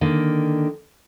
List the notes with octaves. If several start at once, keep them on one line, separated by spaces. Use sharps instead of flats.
D3 D#3 A#3